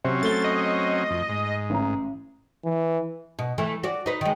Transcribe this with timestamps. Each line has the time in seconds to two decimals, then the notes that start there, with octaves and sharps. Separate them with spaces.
0.04 C3 F#3 C4 C#4
0.23 A3 A6 G7
0.44 D#5
1.10 F2
1.29 G#2
1.70 A1 A#5
2.65 E3
3.39 B2
3.58 E3 A3
3.83 F#4 D5
4.06 D#4 B4
4.21 D#3 G#3